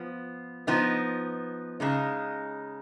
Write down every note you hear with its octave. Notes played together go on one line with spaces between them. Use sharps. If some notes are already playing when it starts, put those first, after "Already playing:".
Already playing: F3 B3
F3 B3 D#4
C#3 G#3 D#4